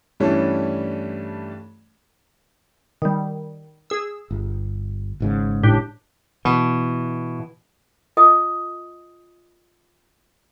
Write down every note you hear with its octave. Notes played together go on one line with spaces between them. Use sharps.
G2 E3 G3 A3 C#4 D4
D#3 G3
G#4 E6
G1
G#1 G#2 C#3
A2 D4 G4
B2 E3
F4 A4 D#5 G5 D#6